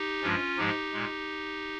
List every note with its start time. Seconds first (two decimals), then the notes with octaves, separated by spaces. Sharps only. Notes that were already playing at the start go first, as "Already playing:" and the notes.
Already playing: D#4 G4
0.23 G2 F3 G#3 C#4 F4
0.57 G#2 F3 G#3 D#4 G4
0.93 A#2 G#3